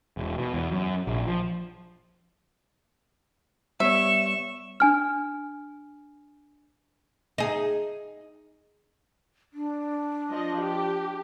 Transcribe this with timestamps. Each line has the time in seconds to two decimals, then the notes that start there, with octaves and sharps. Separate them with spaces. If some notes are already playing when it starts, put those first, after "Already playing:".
0.17 E1
0.38 B2
0.54 E2
0.71 F#2
1.07 A#1
1.27 F3
3.80 G3 B3 C#5 E5 C#6 E7
4.80 D4 G#5 F6
7.38 D#4 G#4
9.53 D4
10.31 F3 D#5
10.60 G4